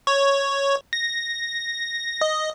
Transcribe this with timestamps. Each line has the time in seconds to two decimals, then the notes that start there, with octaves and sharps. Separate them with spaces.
0.07 C#5
0.93 A#6
2.21 D#5